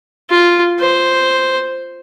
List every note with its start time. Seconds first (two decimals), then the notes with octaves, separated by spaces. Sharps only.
0.30 F4
0.79 C5